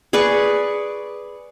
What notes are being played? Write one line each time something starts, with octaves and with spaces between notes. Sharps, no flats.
G#4 B4 D5 C#6